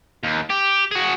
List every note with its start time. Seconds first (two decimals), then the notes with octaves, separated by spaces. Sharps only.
0.23 D#2
0.50 G4
0.92 F#4 G#4